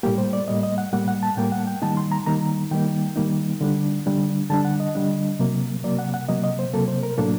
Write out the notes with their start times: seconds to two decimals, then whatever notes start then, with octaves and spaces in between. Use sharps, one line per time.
0.03 A2 G3 A#3 G4
0.18 C5
0.33 D5
0.48 A2 G3 A#3 D#5
0.63 D#5
0.78 F#5
0.93 A2 G3 A#3 F#5
1.08 F#5
1.23 A5
1.37 A2 G3 A#3 G5
1.52 F#5
1.67 G5
1.82 D#3 G3 A#3 D#4 A5
1.97 C6
2.12 A#5
2.26 D#3 G3 A#3 D#4 A#5
2.71 D#3 G3 A#3 D#4 G5
3.16 D#3 G3 A#3 D#4
3.61 D3 G3 D4
4.06 D3 G3 D4
4.50 D3 G3 D4 A5
4.65 F#5
4.80 D#5
4.95 D3 G3 D4
5.39 C3 F#3 A#3
5.84 C3 F#3 A#3 D5
5.99 F#5
6.14 F#5
6.28 C3 F#3 A#3 D#5
6.44 D#5
6.59 C5
6.74 C3 F#3 A#3 A4
6.88 C5
7.03 A#4
7.18 A2 F#3 A#3 D4 A4